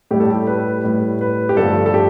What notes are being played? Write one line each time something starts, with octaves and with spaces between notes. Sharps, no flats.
A2 G3 G4
A4
G4
B4
A2 G3
B4
G4
G2 D3 F3 A3 A4
A4
G4